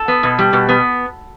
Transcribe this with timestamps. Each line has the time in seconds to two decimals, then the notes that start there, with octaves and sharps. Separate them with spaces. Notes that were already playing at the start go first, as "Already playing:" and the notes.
Already playing: A4
0.08 B3
0.23 B2
0.39 G3
0.53 B2
0.69 B3